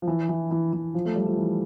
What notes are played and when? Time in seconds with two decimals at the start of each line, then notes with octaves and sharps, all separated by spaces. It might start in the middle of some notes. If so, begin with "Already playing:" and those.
0.02 F3
0.07 E3
0.29 E3
0.51 E3
0.73 E3
0.94 F3
1.05 A3
1.16 G3
1.27 F3
1.38 E3